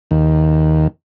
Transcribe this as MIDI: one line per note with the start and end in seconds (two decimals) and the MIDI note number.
0.11 0.87 39